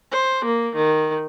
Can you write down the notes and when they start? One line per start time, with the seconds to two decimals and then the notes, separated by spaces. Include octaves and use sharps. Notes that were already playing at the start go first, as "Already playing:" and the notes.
0.11 C5
0.43 A#3
0.75 D#3